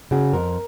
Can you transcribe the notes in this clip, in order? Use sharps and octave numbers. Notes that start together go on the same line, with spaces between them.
C#3 F#4
F2 A#4